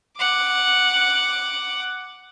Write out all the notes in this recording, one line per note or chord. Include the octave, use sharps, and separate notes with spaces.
F#5 D6